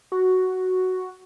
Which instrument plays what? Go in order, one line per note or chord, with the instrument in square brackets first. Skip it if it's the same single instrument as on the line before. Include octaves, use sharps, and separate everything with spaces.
[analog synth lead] F#4